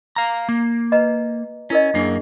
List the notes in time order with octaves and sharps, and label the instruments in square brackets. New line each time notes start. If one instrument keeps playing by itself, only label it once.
[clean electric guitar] F5 A#5
A#3
[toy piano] B4 D#5 A#5
[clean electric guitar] C#4 [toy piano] E4 A#4 D#5
[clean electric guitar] F#2 A#3 [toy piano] D4 G#4